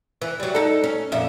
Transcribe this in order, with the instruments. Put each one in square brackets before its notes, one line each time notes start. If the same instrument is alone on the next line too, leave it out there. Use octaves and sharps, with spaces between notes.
[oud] E3
F#3 G3
D#4 A4
C#4
F2 A#2 E5